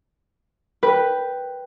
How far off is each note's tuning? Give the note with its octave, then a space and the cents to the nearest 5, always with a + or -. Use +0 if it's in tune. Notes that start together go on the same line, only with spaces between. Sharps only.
B4 +0 G5 +0